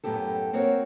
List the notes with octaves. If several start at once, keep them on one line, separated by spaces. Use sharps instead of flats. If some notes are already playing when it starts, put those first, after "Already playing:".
F#2 A2 B3 G4 A4
A#3 C4 F#4 C#5